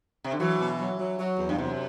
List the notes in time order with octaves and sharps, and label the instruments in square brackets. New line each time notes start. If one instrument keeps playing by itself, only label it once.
[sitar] C3
D3
[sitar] E3 [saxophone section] F#3
[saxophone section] B2
F#3
F#3
F#3
E2
[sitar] G2
[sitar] F#2 [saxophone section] C3